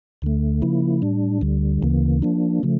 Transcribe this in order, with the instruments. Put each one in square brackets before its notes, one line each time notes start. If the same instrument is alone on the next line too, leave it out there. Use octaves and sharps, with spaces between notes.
[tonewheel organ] D2 D3 A3
C#3 F3 A#3 E4
A2 G3 D4
D2 D3 G3
D2 C#3 E3 A#3
F3 A#3 D4
C#3 F3 A3